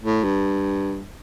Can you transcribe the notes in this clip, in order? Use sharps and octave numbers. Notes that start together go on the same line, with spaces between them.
A2
G2